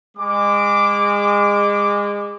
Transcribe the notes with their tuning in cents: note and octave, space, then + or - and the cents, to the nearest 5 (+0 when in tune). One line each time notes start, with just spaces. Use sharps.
G#3 -30 D6 +0